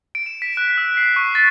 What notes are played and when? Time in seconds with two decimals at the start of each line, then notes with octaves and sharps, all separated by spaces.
0.15 D7
0.26 E7
0.42 B6
0.57 F#6
0.77 E6
0.97 C7
1.16 C#6
1.35 A6